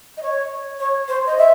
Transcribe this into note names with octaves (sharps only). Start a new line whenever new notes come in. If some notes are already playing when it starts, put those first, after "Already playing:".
D#5
C#5
C#5
C5
D#5
E5